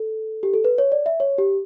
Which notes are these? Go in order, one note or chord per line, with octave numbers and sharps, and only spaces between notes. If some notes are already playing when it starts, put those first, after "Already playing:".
Already playing: A4
G4
A4
B4
C#5
D5
E5
C#5
G4